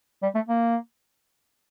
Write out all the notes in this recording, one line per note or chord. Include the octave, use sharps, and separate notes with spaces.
G3
A3
A#3